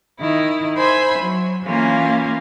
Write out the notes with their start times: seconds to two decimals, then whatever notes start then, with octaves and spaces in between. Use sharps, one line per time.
0.18 D#3 E4
0.77 C5 E5 G#5 B5
1.18 F#3
1.64 E3 A#3 C#4 F4